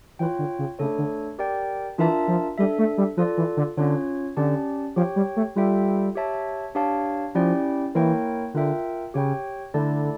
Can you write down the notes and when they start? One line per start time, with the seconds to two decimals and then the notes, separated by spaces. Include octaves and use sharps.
0.19 E3 F4 C#5 G5
0.39 D3
0.59 C#3
0.79 C#3 A3 D4 A4 C#5
0.98 D3
1.39 G4 A#4 D5 G5
1.98 E3 D4 F4 A#4 E5 A5
2.28 F3
2.58 G3 D4 A4 E5
2.78 A3
2.98 G3
3.17 F3 F4 A4 D5
3.37 E3
3.57 D3
3.77 D3 C#4 F4 C#5
4.37 D3 C#4 G4 D5 A5
4.96 F3 G4 C#5 G5
5.16 G3
5.36 A3
5.56 G3 F4 A4 E5 G5
6.16 G4 C#5 E5 A5
6.75 D4 G4 C#5 F5 A5
7.35 F3 C#4 E4 G4 D5 G5
7.95 E3 A#3 E4 A#4 C#5 G5
8.54 D3 F4 A#4 E5 G5
9.14 C#3 G4 C#5 G5
9.74 D3 A3 E4 A4 D5 A5